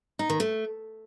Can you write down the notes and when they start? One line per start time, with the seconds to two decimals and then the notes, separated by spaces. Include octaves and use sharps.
0.19 D#4
0.30 D#3
0.40 A3